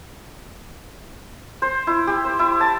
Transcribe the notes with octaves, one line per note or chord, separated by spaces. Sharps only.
C5
E4
G4
C5
E4
A5